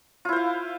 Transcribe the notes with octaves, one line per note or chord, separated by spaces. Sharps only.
E4 F4 C5 F5